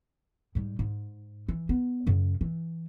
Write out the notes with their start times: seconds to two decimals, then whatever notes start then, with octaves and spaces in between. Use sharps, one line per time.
0.55 G#2 G3
0.79 G#2
1.48 E3
1.69 B3
2.07 F#2 C#3
2.41 E3